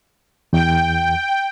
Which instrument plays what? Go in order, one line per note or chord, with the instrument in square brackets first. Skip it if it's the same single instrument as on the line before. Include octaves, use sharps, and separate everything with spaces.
[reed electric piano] E2 [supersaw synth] G5